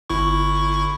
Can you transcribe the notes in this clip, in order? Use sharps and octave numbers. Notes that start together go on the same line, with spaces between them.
G1 E4 C#6